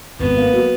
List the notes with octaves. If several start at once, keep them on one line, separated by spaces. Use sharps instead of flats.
G#1 B3
A#3
F#3